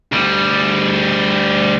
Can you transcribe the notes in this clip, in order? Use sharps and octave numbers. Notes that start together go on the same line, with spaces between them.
D2 G3